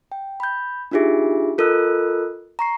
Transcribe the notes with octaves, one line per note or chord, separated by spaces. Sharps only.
G5
B5 G6
D4 D#4 F4 G4 G#4 E5
F4 A4 A#4 D#5 E6 F#6
A#5 C#6 C7